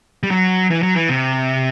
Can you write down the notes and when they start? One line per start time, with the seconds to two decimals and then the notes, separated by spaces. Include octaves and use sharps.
0.23 G3
0.31 F#3
0.70 E3
0.83 F#3
0.96 E3
1.09 C3